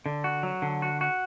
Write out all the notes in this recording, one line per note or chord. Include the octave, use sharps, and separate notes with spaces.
D3
F#4
F#3
D3
F#4
F#4